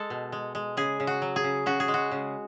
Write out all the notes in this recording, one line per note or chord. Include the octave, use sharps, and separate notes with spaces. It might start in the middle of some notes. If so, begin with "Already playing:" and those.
Already playing: G#3 A4
B2
G#3
G#3
C#3 G#4
C#3
F#4
F#3
G#4
C#3
C#3 F#4
G#4
G#3
F#4
C#3